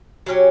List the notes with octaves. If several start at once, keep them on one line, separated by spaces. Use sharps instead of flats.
F#3 C#4 G4